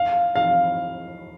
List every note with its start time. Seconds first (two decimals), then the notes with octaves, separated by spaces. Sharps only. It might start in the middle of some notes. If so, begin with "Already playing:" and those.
Already playing: F5
0.36 F5